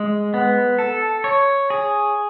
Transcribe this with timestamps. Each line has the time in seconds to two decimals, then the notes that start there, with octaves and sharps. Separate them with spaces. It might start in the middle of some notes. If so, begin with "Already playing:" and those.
Already playing: G#3
0.34 B3
0.78 A4
1.24 C#5
1.70 G#4